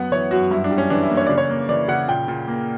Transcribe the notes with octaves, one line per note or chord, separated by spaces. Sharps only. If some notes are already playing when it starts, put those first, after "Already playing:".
Already playing: F#2 B3 F#5
E3 C#5
F#2 F#4
G2 E4
D4
G3
C#4
E3 D4
E4
A#3
C#5
C#3 D5
C#5
A#3
E3 D5
C#3 F#5
A#2 G5
A#2
A#3